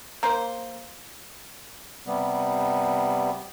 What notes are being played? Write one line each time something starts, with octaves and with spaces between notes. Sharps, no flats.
A#3 C5
C3 G3 B3